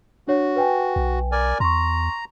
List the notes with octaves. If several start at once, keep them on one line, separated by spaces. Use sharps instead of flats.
D4 F#4 C#5
B4 G5 G#5
B1
A#4 D5 G#5
E2 A#5 C6 C#6